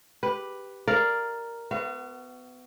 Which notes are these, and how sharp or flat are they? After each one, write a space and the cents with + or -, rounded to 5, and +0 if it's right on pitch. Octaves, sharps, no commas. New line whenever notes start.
G4 +0 B4 +0
A#4 +0 D5 +0 F5 -10
B3 +30 F#4 +15 F5 -40